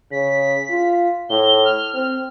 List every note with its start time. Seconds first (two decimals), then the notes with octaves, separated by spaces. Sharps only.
0.12 C#3 B6
0.70 F4
1.30 A2 G7
1.65 F6
1.95 C4 F6